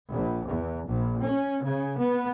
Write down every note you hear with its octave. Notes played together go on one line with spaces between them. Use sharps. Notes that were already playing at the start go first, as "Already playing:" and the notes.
A#1
E2
A#1
C#4
C#3
B3